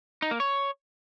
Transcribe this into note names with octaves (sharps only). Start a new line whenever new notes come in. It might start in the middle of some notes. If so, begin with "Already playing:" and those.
D#4
A#3
C#5